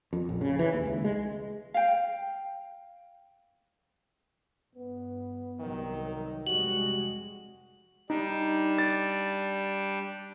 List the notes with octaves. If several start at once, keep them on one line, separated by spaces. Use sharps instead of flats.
F2
A#1
C#3
E3
D#2
C#2
G#3
F5 G5
G2 B3
C2 D#3 F#3
F1 C3 G3 G#3 F#4 F#7
G3 D4 D#4
A6